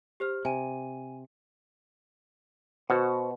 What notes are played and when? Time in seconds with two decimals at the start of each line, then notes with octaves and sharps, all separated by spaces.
0.20 G4 C5 F6
0.45 C3 G#5 D#7
2.90 B2 F#4 C5 F#5